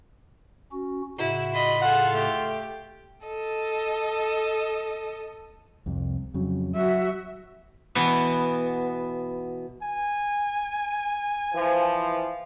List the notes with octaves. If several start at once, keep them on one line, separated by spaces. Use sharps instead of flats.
C#4 F#4
A2 C#3 E4 F#4
F4 D#5 B5
F4 G#4 A4 F#5
A3 G4
A4 D#5
C2 F2 C3
F2 C#3 F#3
F#3 F#4 E5
B2 E3 B3
G#5
E3 F3